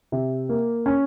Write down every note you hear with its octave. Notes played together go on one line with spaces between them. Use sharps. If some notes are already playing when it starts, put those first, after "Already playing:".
C3
A#3
C#4